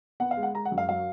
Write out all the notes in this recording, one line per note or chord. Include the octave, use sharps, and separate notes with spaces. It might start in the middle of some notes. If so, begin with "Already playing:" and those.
B3 F#5
F5
G#3
F#5
G#3 A#5
F#5
F#2
F5
F#3 F5